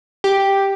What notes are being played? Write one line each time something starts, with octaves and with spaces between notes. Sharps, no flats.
G4